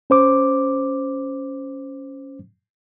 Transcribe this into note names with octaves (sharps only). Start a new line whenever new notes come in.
C#4 C5 D6